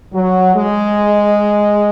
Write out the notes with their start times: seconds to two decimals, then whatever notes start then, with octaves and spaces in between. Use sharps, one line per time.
0.14 F#3
0.54 G#3